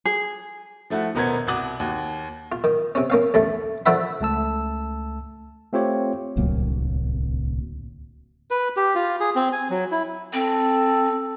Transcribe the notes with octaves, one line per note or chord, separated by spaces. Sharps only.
G#4
F3 A3 E4 F#4
D#1 B2 B3 A#4 C5 G#6
C2 F#4 D6 D#6 F#7
D#2 F#4
F4
D#3
C3 C#4
A#3 C#4 F5
A1 D2 A3
D3 F3 A4 E5 F#5 B5
C#2 A3 A5 E6
A3 C4 F4 G4 C#5
D1 C2 F#3 A#3
B4
G4
F4
G#4
C4
G#5
F#3
E4
C4 A4